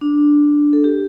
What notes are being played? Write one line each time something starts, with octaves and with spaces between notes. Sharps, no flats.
D4
A4
G4